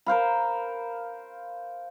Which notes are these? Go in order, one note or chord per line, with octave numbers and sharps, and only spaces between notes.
A#4 C5 F5 B5